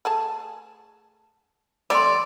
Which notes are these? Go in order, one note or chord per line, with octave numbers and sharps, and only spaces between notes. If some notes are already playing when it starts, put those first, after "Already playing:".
A3 G#4 A5
A3 C4 D5 E5 B5 C6